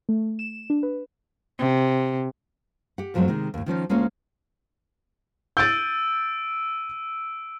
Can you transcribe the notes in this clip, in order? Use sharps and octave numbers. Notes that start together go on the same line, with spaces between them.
A3
E7
D4
B4
C3
G4 F#5
F#2 F3 F#3 G#3 A3 C4
C3 D#3 G#3
D#2 A2
D#3 F3 C#4 D#4
D2 G#3 A#3 C#4 F4 C#5
E6 G6 A6 D7 D#7